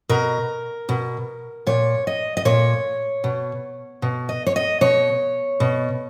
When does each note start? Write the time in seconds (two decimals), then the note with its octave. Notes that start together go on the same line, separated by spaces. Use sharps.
0.09 B2 A#4
0.89 B2
1.67 A#2 C#5
2.07 D#5
2.37 D#5
2.45 A#2 C#5
3.24 B2
4.02 B2
4.29 D#5
4.46 C#5
4.56 D#5
4.81 B2 C#5
5.60 B2